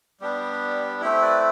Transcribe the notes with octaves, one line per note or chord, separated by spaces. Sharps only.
G3 B3 D4 G4
A3 C4 E4 G4
B4 D5